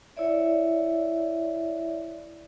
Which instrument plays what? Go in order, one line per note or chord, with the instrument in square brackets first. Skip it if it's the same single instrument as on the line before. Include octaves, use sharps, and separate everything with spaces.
[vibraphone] E4 C#5 D5 E5